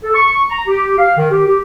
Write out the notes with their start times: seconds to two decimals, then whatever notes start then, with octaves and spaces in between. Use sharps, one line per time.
0.03 A4
0.15 C#6
0.50 A#5
0.68 G4
0.98 F5
1.17 D#3
1.31 G4
1.47 G4